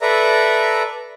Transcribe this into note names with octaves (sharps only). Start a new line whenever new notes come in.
A4 B4 D5 E5 A#5